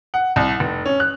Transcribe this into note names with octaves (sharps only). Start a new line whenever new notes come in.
F#5
C2
F1
C#4
F#6